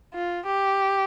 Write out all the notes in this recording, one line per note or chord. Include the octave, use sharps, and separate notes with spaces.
F4
G4